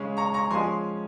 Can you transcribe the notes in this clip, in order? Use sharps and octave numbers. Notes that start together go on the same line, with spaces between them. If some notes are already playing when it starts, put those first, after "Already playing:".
Already playing: C#3 G#3 C#4
A#5 C#6
A#5 C#6
F3 G#3 C#4 G#5 C6